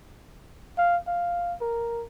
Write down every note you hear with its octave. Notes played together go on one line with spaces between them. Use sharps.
F5
F5
A#4